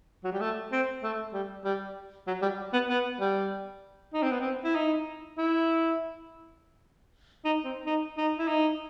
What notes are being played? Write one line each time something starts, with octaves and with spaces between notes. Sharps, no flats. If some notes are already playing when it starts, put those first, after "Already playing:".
F#3
G3
A3
C4
A3
G3
G3
F#3
G3
B3
B3
G3
D#4
C4
B3
C4
E4
D#4
E4
D#4
C4
D#4
D#4
E4
D#4